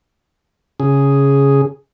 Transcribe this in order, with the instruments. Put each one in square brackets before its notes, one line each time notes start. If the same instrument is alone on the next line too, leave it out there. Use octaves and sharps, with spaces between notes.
[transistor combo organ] C#3 G#4